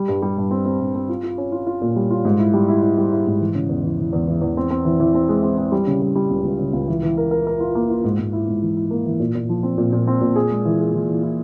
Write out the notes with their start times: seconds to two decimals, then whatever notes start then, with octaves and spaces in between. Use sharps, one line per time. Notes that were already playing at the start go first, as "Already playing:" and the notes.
Already playing: G3
0.08 G2
0.22 G3
0.37 G2
0.51 C4
0.65 C4
0.80 G2
0.95 C4
1.09 F4
1.23 F4
1.38 C#4
1.52 F4
1.67 F4
1.82 A#2
1.96 G3
2.11 F4
2.25 G#2
2.39 E4
2.53 G3
2.68 E4
2.82 E4
2.98 G3
3.12 E4
3.27 G#2
3.40 E3
3.55 C#3
3.69 E2
3.84 E3
3.99 E3
4.13 E2
4.28 E3
4.42 E2
4.57 C4
4.71 C4
4.85 E3
5.00 E3
5.15 C4
5.29 G#3
5.43 C4
5.58 C4
5.72 G3
5.87 C#3
6.02 G3
6.15 G3
6.30 C#2
6.44 C#2
6.59 C#3
6.73 C#2
6.88 E3
7.03 E3
7.17 A#4
7.31 A#4
7.47 A#4
7.60 F4
7.75 A#3
7.90 F4
8.04 G#2
8.19 G#2
8.33 E4
8.48 G#2
8.62 E3
8.77 E4
8.91 A#3
9.06 E3
9.20 A#2
9.35 A#2
9.49 F3
9.63 C4
9.78 A#2
9.92 A#2
10.07 C4
10.21 A#2
10.36 G#4
10.50 G#3
10.65 E3
10.80 G#4
10.94 E3
11.09 E3
11.23 E4